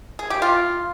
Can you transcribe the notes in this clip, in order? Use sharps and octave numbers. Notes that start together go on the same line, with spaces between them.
G#4
G4
F4